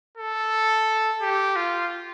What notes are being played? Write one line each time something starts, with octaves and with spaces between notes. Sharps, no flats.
A4
G4
F4